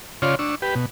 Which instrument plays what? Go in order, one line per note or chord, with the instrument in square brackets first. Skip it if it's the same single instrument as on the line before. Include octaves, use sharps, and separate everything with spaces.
[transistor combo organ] C#3 F4 C#5 D5 C6 F6
D4 C#6 E6
G4 B4
B2